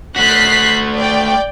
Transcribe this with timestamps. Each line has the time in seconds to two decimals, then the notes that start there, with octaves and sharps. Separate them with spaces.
0.16 A3 F#4 F#6 B6 C7
0.96 D5 G5